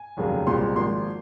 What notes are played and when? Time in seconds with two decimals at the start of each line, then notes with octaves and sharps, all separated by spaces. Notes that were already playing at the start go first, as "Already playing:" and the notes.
Already playing: G#5
0.17 F1 D#2 C#3 F#3 A#3
0.47 C2 A#2 G#3 C4 C6
0.76 G#1 G#2 F3 A#3 C6